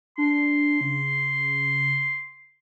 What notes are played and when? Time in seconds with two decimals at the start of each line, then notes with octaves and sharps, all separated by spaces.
0.18 D4 C6
0.81 C#3